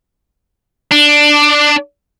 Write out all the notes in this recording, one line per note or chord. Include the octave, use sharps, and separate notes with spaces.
D4